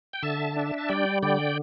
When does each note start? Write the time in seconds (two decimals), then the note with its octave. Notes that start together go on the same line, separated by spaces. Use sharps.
0.13 G5
0.23 D3 E5 A5
0.56 D4
0.78 A5
0.89 G3 D5 G5
1.22 D3 D5 G5